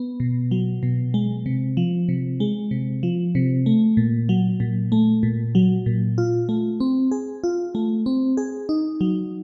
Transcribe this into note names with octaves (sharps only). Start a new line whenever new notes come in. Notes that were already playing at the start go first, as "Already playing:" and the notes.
Already playing: B3
B2
F#3
B2
G#3
C3
F3
C3
G#3
C3
F3
C3
A3
A#2
F#3
A#2
A3
A#2
F#3
A#2
F4
A3
C4
G#4
F4
A3
C4
G#4
D#4
F#3